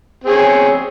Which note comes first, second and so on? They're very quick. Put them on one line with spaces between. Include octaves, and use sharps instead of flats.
C4 G#4 C#5